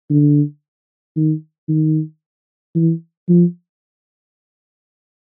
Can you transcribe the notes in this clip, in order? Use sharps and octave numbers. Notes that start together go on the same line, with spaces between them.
D3
D#3
D#3
E3
F3